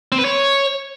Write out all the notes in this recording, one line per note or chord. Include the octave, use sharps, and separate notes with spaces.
C4
B4
C#5